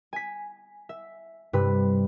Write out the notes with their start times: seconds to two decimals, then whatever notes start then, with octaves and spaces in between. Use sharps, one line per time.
0.13 G#5 B6
0.89 E5
1.53 G2 C3 B4